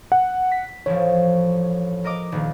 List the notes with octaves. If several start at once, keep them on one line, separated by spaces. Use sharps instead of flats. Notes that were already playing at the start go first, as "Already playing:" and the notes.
F#5
B6
A1 F3 C#5
A#4 D#5 D6
D#1 D#3